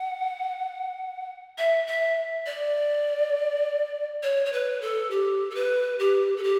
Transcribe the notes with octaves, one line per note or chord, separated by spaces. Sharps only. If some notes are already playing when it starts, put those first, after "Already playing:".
Already playing: F#5
E5
E5
D5
C#5
C#5
B4
A4
G4
A4
B4
G4
A4
G4